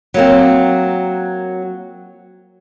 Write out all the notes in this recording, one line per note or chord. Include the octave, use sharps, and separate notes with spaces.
F#3 A#3 C4